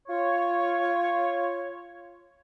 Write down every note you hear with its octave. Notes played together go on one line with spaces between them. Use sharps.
F4 C#5